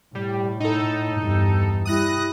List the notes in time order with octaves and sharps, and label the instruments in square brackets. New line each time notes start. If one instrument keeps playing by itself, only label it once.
[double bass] A2 [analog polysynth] G3
[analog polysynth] D#4 A4
[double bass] E2 G2
[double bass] G3 E4 [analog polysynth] D#6 F#6 A#6